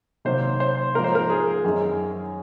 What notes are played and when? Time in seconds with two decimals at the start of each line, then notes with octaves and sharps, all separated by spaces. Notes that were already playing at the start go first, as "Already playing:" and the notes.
0.25 C3 D#3 F#3 A#3 C5
0.60 C5
0.94 G#2 F3 A#3 A#4
1.04 C5
1.15 A#4
1.30 G#4
1.64 F#2 D#3 G#3